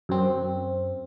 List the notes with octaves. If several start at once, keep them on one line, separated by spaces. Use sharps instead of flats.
F#2 C4